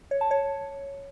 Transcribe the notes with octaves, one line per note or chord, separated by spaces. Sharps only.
C#5
A5
C#5